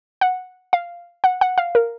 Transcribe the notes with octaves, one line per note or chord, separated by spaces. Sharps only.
F#5
F5
F#5
F#5
F5
A#4